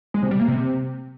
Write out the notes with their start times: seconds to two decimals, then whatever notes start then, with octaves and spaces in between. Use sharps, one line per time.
0.14 G#3
0.23 C3
0.31 G3
0.40 A#3
0.48 C3